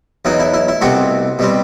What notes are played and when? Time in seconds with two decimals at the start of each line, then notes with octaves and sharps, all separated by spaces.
0.25 E2 B2 F#3 D#4
0.39 E4
0.54 E4
0.68 E4
0.81 C2 B2 A3 C4 F#4
1.39 B2 G3 C4